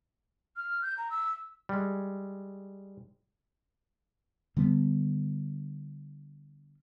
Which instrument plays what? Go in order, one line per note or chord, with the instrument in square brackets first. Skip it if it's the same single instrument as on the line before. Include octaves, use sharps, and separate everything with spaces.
[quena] F6
G6
A#5
E6
[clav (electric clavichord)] G3 G#3
[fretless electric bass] D3 G3 B3